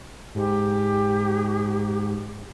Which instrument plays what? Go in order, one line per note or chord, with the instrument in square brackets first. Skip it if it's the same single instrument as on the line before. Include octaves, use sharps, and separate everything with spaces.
[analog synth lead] G#2 [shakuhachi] G4